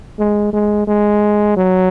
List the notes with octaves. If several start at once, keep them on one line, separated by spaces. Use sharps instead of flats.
G#3
G#3
G#3
F#3